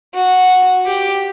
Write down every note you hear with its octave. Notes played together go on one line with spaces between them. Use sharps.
F#4
G4